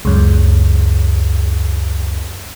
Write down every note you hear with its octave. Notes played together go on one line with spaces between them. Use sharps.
C#2 F#2